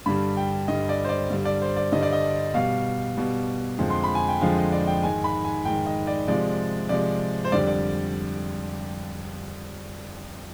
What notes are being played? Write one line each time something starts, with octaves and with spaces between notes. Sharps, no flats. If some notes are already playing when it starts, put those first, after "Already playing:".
G2 D3 G3 B5
G5
G2 D3 G3 D#5
D5
C5
D5
G2 D3 G3
D5
C5
D5
G2 D3 G3 D#5
D5
D#5
B2 G3 F5
B2 G3
F2 D3 F3 G#3
C6
B5
G#5
G5
F2 D3 F3 G#3 F5
D#5
D5
G5
G#2 D#3 G#3 G#5
B5
G#5
G#2 D#3 G#3 G5
D#5
D5
C3 F3 G#3 D5
C3 F3 G#3 D5
C5
F2 D3 G3 D5
D5